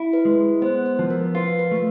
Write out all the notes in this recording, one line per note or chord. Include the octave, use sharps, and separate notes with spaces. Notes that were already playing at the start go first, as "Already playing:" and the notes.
Already playing: E4
B4
G#3
B3 C5
C5
F3
A#4
F4 B4
B4
A3 B4